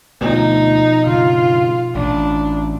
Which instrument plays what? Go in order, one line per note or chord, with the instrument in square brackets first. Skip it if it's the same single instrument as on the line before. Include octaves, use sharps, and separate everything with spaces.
[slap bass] D2 A3 [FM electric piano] B2 F3 [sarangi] D#4
[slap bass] G2 C#3 [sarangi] F4
[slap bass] A1 [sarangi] D4